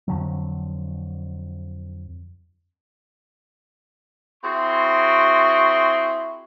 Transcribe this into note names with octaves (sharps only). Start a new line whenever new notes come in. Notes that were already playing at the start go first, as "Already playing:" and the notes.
F2 D3 F#3
C4 E4 F#4 G#4 C6